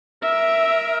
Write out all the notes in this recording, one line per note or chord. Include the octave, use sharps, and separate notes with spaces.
A#4 E5